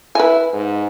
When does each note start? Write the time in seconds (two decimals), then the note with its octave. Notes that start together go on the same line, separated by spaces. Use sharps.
0.15 E4 B4 G#5
0.53 G#2